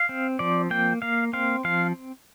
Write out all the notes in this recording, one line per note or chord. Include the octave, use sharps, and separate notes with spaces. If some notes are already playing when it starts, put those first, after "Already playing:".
Already playing: F5
C4
F3 D5
A#3 G5
A#3 F5
C4 F5
F3 F5